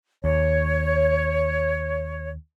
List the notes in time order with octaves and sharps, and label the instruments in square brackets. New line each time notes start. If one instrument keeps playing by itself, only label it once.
[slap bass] D#2 [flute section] C#5